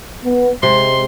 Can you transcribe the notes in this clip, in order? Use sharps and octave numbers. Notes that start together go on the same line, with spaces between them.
B3
C3 G#3 C6